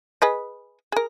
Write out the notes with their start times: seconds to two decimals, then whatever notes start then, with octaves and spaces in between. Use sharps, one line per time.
0.22 G#4 B4 D#5
0.92 G#4 A#4